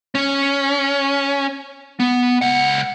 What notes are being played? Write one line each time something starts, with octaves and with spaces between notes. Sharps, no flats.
C#4
B3
C#2 F#5